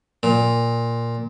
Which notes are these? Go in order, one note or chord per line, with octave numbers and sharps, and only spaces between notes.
A#2